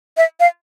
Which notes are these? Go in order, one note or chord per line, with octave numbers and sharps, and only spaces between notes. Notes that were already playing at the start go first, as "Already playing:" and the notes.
E5
F5